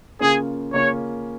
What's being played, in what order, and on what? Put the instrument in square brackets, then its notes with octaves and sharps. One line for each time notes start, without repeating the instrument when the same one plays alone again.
[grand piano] C#3 A#3 C#4 F4 [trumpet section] G#4
[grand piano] C#3 A#3 C#4 F4 [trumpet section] C#5